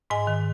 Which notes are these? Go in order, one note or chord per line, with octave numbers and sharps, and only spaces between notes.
G#2 D#5 G#5
D#3